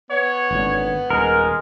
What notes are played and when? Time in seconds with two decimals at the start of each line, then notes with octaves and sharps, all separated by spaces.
0.11 B3 C#5
0.51 G#1 A#2 D3
1.10 D#1 G#3 A#4